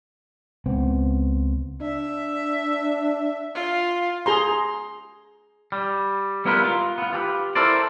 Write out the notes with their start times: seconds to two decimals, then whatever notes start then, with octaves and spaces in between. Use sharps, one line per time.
0.66 C#2 B3 C4
1.81 D4 E5
3.55 F4
4.26 G#4 A#5 C6
5.72 G3
6.45 G3 B3 E4 F4 A#4 B4
6.64 F4
6.98 B3 F4
7.13 F4 G4 A4 B4
7.55 E4 A4 A#4 C5 D5